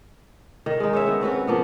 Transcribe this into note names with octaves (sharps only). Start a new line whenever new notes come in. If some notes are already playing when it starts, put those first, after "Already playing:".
D#3
G#3 D#4
C#4 C#5 E5
D#3 B3
C4 C#4 F#4 B4
F3 A#3 B3